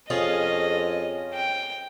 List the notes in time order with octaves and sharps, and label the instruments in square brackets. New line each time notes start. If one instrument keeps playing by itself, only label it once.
[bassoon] F2 [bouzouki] C#4 F4 G#4 [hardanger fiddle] D#5
[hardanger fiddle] G5